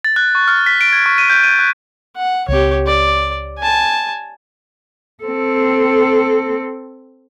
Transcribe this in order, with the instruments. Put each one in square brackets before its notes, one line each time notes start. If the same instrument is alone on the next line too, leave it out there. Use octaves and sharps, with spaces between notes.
[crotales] A6
F#6
C#6
F6
B6
D7
G#6
C#6
D#7
G6
D#7
F#6
[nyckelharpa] F#5
[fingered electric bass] C#2 C4 [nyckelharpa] G4 C#5
[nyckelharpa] D5
G#5 A5
[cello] C4 A4